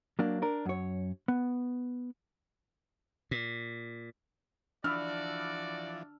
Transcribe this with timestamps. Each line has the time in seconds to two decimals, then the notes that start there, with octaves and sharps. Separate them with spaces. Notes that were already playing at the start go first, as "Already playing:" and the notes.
0.19 F#3 A#3 D4
0.42 D4 A#4
0.66 F#2 C#5
1.28 B3
3.31 A#2
4.84 E3 F3 D4 F#4 D5 B5 E6 F6